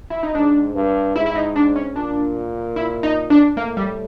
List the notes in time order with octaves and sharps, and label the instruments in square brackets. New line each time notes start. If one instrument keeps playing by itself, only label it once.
[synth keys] E4
D#4
[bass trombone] G#2 [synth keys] D4
[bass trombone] G2
[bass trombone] G#2 [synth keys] E4
[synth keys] E4
D#4
D4
C#4
[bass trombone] A#2 [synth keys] D4
[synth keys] E4
D#4
D4
[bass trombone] A2 [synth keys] A#3
[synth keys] G3